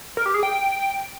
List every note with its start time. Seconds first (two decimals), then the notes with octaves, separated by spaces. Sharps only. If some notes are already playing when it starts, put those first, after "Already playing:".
0.17 A#4
0.26 G4
0.34 G#4
0.43 G5